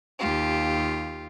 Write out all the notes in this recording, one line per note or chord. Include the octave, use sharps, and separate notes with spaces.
D#2 F4 G4